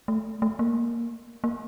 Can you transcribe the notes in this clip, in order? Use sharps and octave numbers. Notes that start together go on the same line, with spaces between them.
A3
A3
A#3
A#3